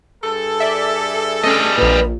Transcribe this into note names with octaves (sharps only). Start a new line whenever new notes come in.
G2 G#4 A4
D5 E5
G3 A3 C#4 D#5
A#1 A#2 B4